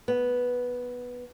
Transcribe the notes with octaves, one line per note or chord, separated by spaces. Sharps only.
B3